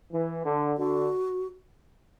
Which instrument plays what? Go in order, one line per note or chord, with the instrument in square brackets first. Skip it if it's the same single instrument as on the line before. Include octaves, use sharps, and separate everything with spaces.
[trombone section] E3
D3
[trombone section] D3 [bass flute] F#4